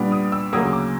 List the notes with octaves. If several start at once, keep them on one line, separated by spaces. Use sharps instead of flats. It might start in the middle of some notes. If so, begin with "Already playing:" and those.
Already playing: A#2 G3 B3 D4
D#6
E6
D2 C#3 F#3 A#3 D#6
D6